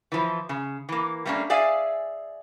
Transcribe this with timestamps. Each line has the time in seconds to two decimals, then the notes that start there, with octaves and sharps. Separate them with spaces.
0.12 E3 F3
0.49 C#3
0.89 E3 A#3
1.25 G3 A3 A#3 C#4 D4
1.50 G#4 D5 E5 F5 G#5